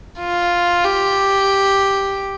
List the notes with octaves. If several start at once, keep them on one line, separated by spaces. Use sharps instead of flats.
F4
G4